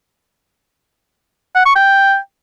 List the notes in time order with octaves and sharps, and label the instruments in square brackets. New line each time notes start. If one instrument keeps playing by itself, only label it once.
[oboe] F#5
C#6
G5